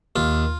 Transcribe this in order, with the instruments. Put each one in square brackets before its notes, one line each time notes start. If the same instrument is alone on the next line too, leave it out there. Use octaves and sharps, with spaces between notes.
[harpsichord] D#2 F4